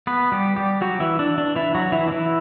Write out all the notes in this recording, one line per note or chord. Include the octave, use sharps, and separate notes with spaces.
B3 B4
G3 G4
G3 G4
F#3 F#4
E3 E4
D4
D4
E3 E4
F#3 F#4
E3 E4
D4
E3 E4